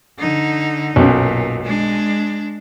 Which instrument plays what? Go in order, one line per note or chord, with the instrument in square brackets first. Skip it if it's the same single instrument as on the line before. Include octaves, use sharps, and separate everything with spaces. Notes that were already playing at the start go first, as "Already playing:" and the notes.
[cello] D3 D#4
[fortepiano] B1 F#2 [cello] A#2
[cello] G#3 D4